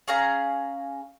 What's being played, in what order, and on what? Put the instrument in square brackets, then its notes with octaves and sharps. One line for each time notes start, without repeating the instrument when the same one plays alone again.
[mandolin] C#4 G#4 F5 A#5